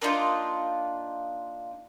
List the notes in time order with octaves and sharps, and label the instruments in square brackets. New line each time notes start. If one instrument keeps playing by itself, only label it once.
[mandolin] A#3 D4 D#4 F4